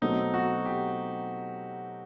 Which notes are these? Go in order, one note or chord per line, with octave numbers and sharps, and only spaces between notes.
B2 F#3 A3 C4 D#4
F#4
G4